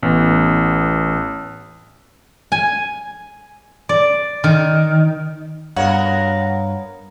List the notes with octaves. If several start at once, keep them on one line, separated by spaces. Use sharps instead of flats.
A1 B3
G#5
D5
D#3
G2 B3 F#4 A#4 C#5 F5